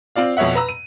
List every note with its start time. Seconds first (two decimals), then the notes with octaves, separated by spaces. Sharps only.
0.16 C4 F4 D5 F5
0.37 F2 B2 C#5 E5 F#5
0.55 B4 A#5 E6
0.69 D#7